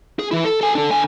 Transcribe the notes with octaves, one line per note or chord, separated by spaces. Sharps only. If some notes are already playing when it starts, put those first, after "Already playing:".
G#4
E3 E4
A4
A4 G#5
D4 A4
D3 G#5